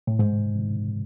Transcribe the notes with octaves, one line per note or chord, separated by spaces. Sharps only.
A2
G#2